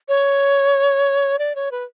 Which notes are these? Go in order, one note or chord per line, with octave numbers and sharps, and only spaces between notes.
C#5
D5
C#5
B4